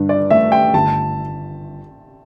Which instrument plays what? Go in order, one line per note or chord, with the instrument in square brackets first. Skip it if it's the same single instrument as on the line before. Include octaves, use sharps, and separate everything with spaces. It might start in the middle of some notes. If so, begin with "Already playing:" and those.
Already playing: [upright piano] G2 D3
[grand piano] D5
[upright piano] A3 [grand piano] E5
[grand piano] G5
[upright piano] G1 [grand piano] A5